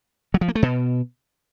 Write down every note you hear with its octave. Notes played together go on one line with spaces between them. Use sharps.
F#3
F3
A#3
A3
B2